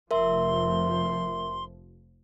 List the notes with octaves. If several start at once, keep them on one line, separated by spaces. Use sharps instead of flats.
F1 F3 A#4 E5 C6